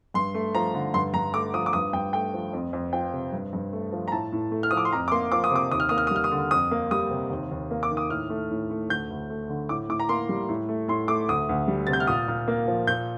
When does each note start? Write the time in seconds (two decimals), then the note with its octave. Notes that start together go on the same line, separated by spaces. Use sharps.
0.14 G2 C6
0.34 A3
0.55 F3 A#5
0.74 D3
0.94 G2 C6
1.14 G2 A#5
1.34 A3 D6
1.54 F3 D#6
1.66 D6
1.73 G2 D#6
1.93 G2 G5
2.13 A3 G5
2.34 F3
2.53 F2
2.73 F2
2.93 F3 G5
3.14 C3
3.33 G2
3.53 G2
3.73 A3
3.92 F3
4.08 A#5
4.12 A2 A5
4.32 A2
4.52 A3
4.63 F6
4.71 F3 D#6
4.77 D6
4.85 C6
4.92 F2 A#5
5.08 D6
5.12 A#3 C6
5.32 F3 D6
5.44 D#6
5.51 C3 D6
5.71 D#2 D#6
5.80 F6
5.89 A#3 D#6
5.98 F6
6.07 D#6
6.11 G3 F6
6.24 D#6
6.31 D3
6.51 F2 D#6
6.71 A#3
6.91 G3 D#6
7.11 C3
7.30 D#2
7.51 D#2
7.71 A#3
7.83 D6
7.91 D#3
7.97 D#6
8.10 A2 F6
8.30 A3
8.51 A2
8.70 A3
8.89 D2 G6
9.10 D2
9.30 A3
9.50 D3
9.69 A2 D6
9.89 A2 D6
10.00 A#5
10.09 A#3 C6
10.29 G3
10.49 A2
10.68 A3
10.88 A2 C6
11.08 A3 D6
11.29 D2 D#6
11.49 D2
11.68 G3
11.87 C3 A6
11.93 G6
12.00 F6
12.07 A#2 D#6
12.28 A#2
12.48 A#3
12.68 F3
12.87 A#2 G6